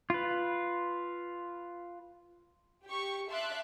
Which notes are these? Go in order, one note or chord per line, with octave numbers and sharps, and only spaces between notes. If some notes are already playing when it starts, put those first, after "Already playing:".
F4 B4
G4 C#6
E5 F5 A5 C6 D6 F#6